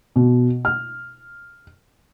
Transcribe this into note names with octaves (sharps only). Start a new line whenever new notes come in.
B2
F6